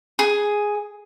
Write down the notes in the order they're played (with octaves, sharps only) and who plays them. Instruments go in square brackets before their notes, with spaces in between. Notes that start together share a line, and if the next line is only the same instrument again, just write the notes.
[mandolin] G#4